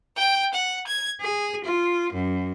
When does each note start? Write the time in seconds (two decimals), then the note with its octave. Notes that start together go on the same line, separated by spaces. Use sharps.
0.16 G5
0.53 F#5
0.86 G#6
1.21 G#4
1.65 F4
2.12 F#2